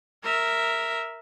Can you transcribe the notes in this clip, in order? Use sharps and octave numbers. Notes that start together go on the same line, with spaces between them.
A#4 E5